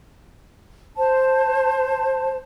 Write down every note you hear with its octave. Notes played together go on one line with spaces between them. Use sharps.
C5 A5